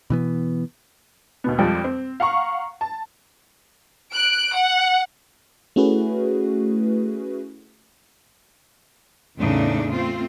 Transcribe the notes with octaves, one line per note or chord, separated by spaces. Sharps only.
B2 E3 B3
D#2 B2 B3
F2 F3 G3 G#3
C4
F5 F#5 A#5 C#6
A5
F#6 D7
F#5
A3 C#4 E4 F#4 G#4 B4
E2 A2 C#3 A3 D4 D#4
A3 C4 F4